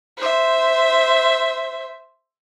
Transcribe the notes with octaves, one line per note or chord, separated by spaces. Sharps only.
C5 E5